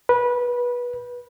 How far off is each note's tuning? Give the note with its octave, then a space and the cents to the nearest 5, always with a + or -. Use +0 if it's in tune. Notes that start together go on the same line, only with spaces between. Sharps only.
B4 -20